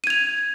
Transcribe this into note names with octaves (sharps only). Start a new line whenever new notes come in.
G#6 D#7 F7